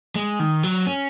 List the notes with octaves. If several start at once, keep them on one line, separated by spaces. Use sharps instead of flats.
G#3
D#3
F#3
C#4